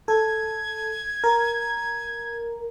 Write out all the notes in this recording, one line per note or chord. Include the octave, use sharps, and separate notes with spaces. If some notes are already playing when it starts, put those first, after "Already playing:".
A4 G#6
A#4